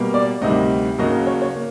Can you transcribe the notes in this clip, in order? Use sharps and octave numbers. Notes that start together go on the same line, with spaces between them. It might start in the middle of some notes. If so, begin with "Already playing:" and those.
Already playing: B2 G3 A#3
D5
D2 C3 D#3 G3 D#5
D#2 C#3 F#3 A#3 D#5
C#5
C#5
A#3